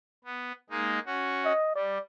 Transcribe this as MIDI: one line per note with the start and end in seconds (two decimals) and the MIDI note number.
0.24 0.52 59
0.70 0.99 56
0.70 0.99 58
0.70 0.99 63
1.06 1.53 61
1.06 1.53 66
1.45 1.75 75
1.75 1.98 55
1.75 2.00 74